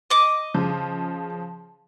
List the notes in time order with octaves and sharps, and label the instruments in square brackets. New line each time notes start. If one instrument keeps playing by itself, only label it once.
[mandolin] D#5 D6
[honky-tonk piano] C#3 F3